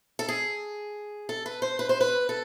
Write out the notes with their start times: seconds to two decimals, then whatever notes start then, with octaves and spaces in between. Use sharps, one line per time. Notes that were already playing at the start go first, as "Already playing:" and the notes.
0.19 A4
0.28 G#4
1.29 A4
1.46 B4
1.62 C5
1.79 B4
1.89 C5
2.01 B4
2.29 A4